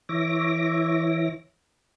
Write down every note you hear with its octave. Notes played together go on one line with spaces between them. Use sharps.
E3 C#5 E5 D6 A#6